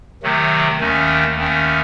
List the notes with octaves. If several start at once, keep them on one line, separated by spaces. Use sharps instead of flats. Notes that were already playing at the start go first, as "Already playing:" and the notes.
C3 D#3 F#3 A3
D#2 D#3 A3 C#4
D#2 D#3 A3 C#4